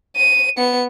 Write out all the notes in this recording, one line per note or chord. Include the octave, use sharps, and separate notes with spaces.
D#7
B3 C#7